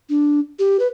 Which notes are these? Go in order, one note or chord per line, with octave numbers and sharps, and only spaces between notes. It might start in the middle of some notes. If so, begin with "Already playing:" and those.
D4
G4
B4